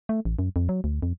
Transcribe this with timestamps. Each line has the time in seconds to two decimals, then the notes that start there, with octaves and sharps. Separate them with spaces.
0.09 A3
0.25 A1
0.39 F#2
0.56 F2
0.69 F#3
0.84 D2
1.02 F2